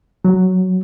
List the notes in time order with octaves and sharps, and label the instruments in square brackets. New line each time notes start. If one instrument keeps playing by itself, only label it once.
[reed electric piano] F#3